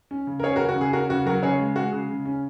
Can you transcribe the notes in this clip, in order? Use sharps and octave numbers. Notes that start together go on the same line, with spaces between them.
C#4
C#3
A#4
C#4 G#4 C#5
C#3 F#4 A#4
F#4
C#3 G#4
C#4 F#4 A#4
C#3 F#4
F#3 F#4 A#4
C#3 G#4 C#5
G#3
G#3 F#4
C#3 G#4
C#3
C#4